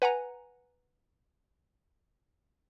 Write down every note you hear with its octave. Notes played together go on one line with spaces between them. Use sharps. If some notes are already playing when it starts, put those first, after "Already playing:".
B4 F#5 G#5 A#5